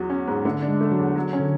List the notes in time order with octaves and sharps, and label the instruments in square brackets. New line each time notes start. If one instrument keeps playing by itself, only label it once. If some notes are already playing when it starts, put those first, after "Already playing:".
Already playing: [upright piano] E2 F#3 F#4 [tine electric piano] B3
[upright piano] C#4
G#2
[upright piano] D3 [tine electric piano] A3
[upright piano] D4
[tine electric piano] G#3
[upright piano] A3
[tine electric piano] F#3
[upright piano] E2
F#3
C#4
[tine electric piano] D3